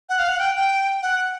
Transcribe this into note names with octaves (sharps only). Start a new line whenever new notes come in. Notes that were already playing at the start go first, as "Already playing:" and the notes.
F#5
F5
F#5
G5
G5
F#5